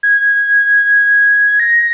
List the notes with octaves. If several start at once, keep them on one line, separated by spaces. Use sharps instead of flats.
G#6
A#6